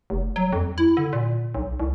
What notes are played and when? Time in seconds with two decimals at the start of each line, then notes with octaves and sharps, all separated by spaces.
0.10 F1
0.36 F#3
0.53 F2
0.78 E4
0.97 D3
1.13 A#2
1.55 B1
1.80 C2